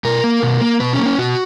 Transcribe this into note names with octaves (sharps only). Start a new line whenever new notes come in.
B2 A#4
A#3
B2
A#3
B2 B4
C#4
A#3
C#4
B2 F#4